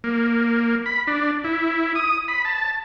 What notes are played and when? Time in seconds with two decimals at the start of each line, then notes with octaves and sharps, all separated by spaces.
0.04 A#3
0.86 B5
1.07 D4
1.44 E4
1.95 D#6
2.28 B5
2.45 A5